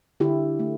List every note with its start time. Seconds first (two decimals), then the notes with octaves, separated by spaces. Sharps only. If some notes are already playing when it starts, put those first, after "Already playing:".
0.20 D3 E4 G4
0.59 A3